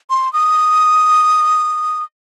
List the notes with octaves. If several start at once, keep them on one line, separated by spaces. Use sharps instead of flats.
C6
D#6